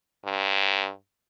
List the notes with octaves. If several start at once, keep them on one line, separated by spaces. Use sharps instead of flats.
G2